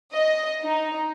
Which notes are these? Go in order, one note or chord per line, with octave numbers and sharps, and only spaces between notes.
D#5
D#4